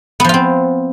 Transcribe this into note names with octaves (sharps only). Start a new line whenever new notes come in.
F3 B3 C4 F4